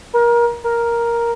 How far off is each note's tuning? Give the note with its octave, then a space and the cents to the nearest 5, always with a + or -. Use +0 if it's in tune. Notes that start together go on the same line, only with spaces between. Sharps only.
A#4 +25
A#4 +5